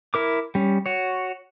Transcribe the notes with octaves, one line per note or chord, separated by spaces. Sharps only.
E4 A#4 D6
G3 C#4
F#4 C#5